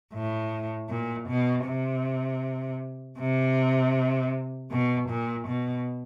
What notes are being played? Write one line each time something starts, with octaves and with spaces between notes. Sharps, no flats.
A2
A#2
B2
C3
C3
B2
A#2
B2